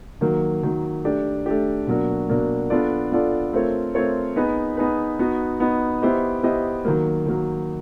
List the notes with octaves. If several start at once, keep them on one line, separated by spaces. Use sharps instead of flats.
D#3 F#3 A#3
D#3 F#3 A#3
A3 D4 G4
A3 D4 G4
B2 F#3 A#3 D4
B2 F#3 A#3 D4
B3 D4 F4 A4 D5
B3 D4 F4 A4 D5
A3 C4 F4 A#4 C#5
A3 C4 F4 A#4 C#5
B3 D#4 G#4 B4
B3 D#4 G#4 B4
B3 D#4 F#4
B3 D#4 F#4
B3 E4 G4 C5 D#5
B3 E4 G4 C5 D#5
D#3 F#3 A#3
D#3 F#3 A#3